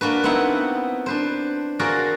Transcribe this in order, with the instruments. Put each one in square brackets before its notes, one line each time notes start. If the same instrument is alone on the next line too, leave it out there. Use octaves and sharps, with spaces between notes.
[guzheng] A#3 D4 F#4 B4
B3 C4 D#4 E4 F#5 B5
D4 B4 C5
F4 F#4 G#4 A#4 D5 F#5